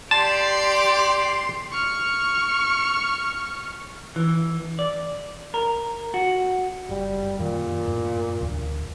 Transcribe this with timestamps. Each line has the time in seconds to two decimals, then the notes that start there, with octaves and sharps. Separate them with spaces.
0.11 G4 D5 A5 C6
1.72 C#6 F6
4.16 E3
4.79 D5
5.54 A#4
6.14 F#4
6.89 F#1 G3
7.39 F#2 A#2 D#3
7.87 F#2 A2
8.40 E1 D2 D3